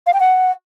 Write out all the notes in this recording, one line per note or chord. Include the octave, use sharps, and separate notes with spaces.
F5
G5
F#5